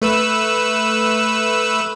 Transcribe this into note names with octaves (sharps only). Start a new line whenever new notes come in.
A3 B4 E6